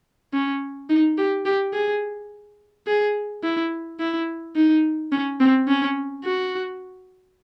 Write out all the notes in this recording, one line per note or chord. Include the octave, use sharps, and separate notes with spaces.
C#4
D#4
G4
G4
G#4
G#4
E4
E4
D#4
C#4
C4
C#4
F#4